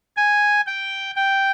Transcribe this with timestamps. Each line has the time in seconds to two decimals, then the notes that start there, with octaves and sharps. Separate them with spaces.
0.17 G#5
0.66 G5
1.16 G5